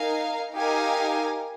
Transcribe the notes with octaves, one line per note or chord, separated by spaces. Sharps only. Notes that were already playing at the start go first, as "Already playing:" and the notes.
Already playing: D#4 A#4 F5 G#5
D#4 G4 A#4 F5 G#5